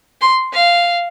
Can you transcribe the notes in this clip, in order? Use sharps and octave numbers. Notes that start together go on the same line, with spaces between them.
C6
F5